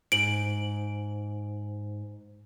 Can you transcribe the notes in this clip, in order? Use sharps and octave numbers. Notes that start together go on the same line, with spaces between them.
G#2 D7 F#7